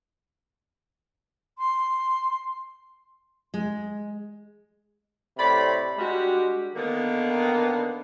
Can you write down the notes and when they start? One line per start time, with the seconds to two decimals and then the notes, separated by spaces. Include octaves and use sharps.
1.57 C6
3.54 G#3
5.38 A2 C3 D5 B5
5.98 G3 G#3 D4 F#4 G4
6.75 D3 D#3 A#3 B3 D4